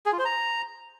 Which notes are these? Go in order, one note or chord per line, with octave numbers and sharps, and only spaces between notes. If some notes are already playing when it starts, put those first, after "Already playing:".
G#4
F4
C5
A#5